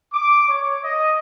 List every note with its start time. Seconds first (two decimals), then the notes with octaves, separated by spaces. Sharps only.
0.13 D6
0.48 C#5
0.84 D#5